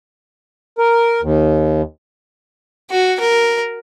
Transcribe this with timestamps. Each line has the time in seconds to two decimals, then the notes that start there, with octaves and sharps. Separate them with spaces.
0.78 A#4
1.22 D#2
2.91 F#4
3.20 A#4